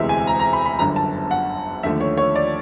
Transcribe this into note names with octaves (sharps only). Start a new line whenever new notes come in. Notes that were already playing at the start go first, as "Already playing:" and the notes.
Already playing: E1 D2 C3 E3 G#3 E5
G#5
A#5
A#5
B5
B5
G1 F#2 D3 A#5
A5
F#5
D#2 D3 F3 A3 E5
C#5
C#5
D5